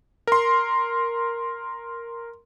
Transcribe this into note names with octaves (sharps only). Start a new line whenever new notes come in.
A#4 C6